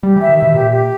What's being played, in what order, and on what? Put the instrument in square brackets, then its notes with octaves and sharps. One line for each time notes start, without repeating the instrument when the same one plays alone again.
[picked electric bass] G3 [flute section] G4
[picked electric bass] E3 [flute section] E5
[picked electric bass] D#3
[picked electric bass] B2 [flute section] E5
[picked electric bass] A#2 [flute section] G4
[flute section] G4